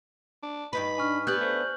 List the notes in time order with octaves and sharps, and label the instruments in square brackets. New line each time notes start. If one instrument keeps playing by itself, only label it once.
[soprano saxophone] D4
[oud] G2 D#4 B4 [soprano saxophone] B5
[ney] D4 [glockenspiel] G#5 C#6 F6
[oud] B3 D4 [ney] G4 [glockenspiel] F#6 G6 F#7
[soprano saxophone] A3 [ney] C5